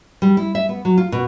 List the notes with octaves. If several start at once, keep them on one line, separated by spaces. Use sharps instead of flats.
G3
E4
E5
B3
F#3
F4
B2